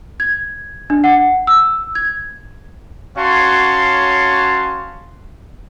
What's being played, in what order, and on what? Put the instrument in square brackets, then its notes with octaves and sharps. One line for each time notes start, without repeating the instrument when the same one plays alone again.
[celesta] G#6
D4
F#5
E6
G#6
[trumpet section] C#4 F#4 C#5 F5 A5 C6